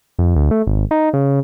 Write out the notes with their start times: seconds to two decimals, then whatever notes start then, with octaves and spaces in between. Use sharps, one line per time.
0.19 F2
0.36 D2
0.51 A3
0.67 G#1
0.91 D#4
1.13 C#3